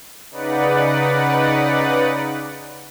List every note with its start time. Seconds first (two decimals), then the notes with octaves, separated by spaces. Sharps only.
0.31 C#3 D#4 B4 D5 F#5